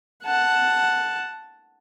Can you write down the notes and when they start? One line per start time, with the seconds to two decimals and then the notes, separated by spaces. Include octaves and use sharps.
0.24 F#5 A5